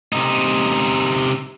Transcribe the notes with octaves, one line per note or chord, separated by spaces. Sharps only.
C3 D#4